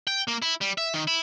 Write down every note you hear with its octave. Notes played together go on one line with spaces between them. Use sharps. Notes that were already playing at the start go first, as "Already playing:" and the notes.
G5
A#3
E4
G3
E5
D#3
E4